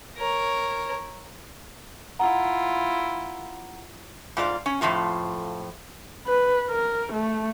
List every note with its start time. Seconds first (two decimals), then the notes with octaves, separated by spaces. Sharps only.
0.17 A#4 C#5
2.19 E4 F4 F#5 A#5
4.37 G#2 F4 D5
4.66 C#4
4.81 F2 A2 C#3 F3 F4
6.27 B4
6.71 A#4
7.13 A3